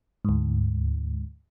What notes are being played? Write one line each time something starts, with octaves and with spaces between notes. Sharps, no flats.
D2 G#2